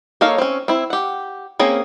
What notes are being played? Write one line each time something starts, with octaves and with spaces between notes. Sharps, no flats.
A#3 D#4 A4 C#5 F5
C4 C#4
C4 E4
G4 F#5
A#3 C4 C#4 G#4